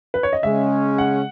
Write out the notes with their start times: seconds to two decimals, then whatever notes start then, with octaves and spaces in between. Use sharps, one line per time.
0.14 B4
0.23 C#5
0.33 D#5
0.43 C#3 G#3 C#4 E5
0.98 F#5